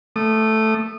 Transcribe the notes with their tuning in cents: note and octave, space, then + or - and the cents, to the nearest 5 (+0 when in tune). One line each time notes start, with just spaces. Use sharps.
A3 +0 D#6 -30